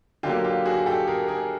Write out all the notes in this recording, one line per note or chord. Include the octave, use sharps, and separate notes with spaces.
D3 F#3 A#3 F4 G4
F4 G4
F#4 G#4
G4 A4
G#4 A#4
G#4 A#4